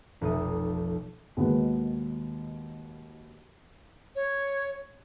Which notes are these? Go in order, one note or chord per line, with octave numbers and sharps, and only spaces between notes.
F1 B1 A4 D#6
D#2 B2 D#3 G#3 B3
C#5